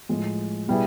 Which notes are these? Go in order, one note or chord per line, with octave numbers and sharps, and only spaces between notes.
A2 F3 G#3
B2 G3 B3 E4 G#4